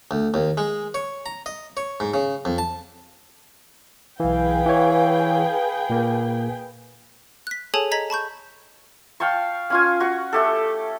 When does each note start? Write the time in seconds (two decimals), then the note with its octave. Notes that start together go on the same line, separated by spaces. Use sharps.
0.11 D2
0.34 D#2
0.58 G#3
0.94 C#5
1.26 A#5
1.46 D#5
1.77 C#5
2.00 G#2
2.14 C#3
2.45 F2
2.58 A5
4.20 B1 E3 G#4 B4 F5 G5
4.66 E3 C#5
5.90 A#2 A#3
7.47 F#6 B6
7.74 G#4 A4 C#5 G#5 A5
7.91 D#5 A#5 G#6 B6 F#7
8.10 A5 B5 C#6 G6
9.20 F5 G5 A5 C#6
9.70 C#4 F4 G#5
10.00 F#4 C#6
10.33 A3 G4 A4